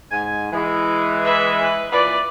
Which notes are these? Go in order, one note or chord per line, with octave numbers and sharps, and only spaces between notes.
G#2 G#5
E3 G#3
B4 E5
B4
A#2 E3 B4 D5